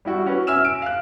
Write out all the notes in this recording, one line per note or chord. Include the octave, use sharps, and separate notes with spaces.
G3 E4 F#4
C#4 F#4 B4
E5 G#5 E6 F6 E7
D7
F5 F#6